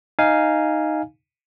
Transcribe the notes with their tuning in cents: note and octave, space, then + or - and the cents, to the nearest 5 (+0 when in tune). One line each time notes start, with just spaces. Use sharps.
D#4 +0 F5 -5 G#5 +0